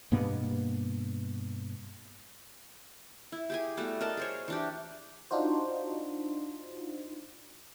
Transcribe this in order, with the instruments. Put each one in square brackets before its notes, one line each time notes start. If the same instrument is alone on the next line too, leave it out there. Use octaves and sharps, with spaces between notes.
[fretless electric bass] G2 B2 A#3 B3
[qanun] E4
G4 G#4 G#5
G3 A3 B3 F#4
A#4 D5 D#5 A5
G#4 C5 C#5
E3 D4 G4
[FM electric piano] D4 D#4 F4 F#4 C5